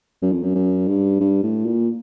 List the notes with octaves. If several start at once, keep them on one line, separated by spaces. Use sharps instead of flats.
F#2
F2
F#2
F#2
G2
G2
A2
A#2